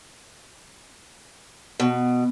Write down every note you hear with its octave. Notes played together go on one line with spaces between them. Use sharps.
B2